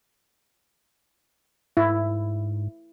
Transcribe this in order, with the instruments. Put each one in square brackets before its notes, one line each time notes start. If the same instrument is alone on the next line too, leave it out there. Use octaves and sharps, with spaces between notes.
[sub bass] G#2 [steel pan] E4